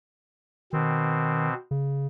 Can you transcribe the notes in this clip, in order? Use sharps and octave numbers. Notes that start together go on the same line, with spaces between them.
B2 D#3 C4
C#3